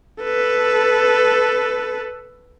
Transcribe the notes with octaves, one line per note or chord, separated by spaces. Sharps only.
A4 B4